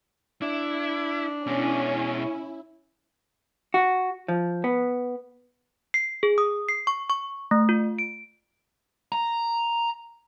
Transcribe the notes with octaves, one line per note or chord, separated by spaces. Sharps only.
D4 E4
B2 G#3 C#4 E4
F#4
F3
B3
C7
G#4
D#6
C7
C#6
C#6
A3
F4
D7
A#5